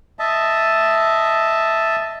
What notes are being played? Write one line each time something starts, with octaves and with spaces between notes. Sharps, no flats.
D#5 E5 A5